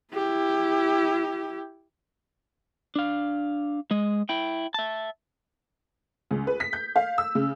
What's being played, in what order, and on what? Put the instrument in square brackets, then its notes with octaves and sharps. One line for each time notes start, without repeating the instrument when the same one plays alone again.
[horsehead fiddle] E4 G4
[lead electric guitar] D4 F5
G#3 D#5
E4 G5
E5 A5
[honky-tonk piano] C#2
B4
B6
G6
F5
E6
C#3